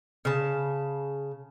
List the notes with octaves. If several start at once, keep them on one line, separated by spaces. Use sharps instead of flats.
C#3 A5